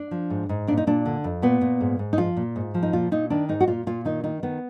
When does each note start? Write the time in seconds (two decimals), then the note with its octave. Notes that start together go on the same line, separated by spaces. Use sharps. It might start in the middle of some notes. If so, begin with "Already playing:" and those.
Already playing: D4
0.11 F3
0.30 G#2
0.49 G#2
0.67 A#2 D4
0.77 D#4
0.87 A#2 D4
1.06 D3
1.24 F2
1.42 A#2 B3
1.61 A#2
1.81 G#2
1.99 G#2
2.13 D#4
2.17 F3 F4
2.37 A#2
2.56 G#2
2.74 F3
2.83 D#4
2.93 A#2 F4
3.11 A#2 D#4
3.30 D#3 D4
3.49 G#2 D#4
3.60 F#4
3.68 A#2 F4
3.87 A#2 F4
4.05 D#3 D#4
4.24 D#3 D#4
4.43 D#3 B3